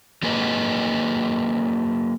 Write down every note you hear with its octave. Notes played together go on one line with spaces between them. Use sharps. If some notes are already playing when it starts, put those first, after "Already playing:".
F#3 A#3 G#4 B4 D5 D#5